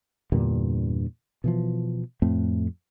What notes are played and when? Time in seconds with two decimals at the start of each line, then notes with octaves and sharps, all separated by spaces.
0.32 E2 G2 A#2 D3
1.44 B2 E3 F3
2.22 F2 A2 A3 C4